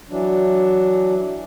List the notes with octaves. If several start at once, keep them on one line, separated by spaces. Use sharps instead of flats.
E3 F#3 D4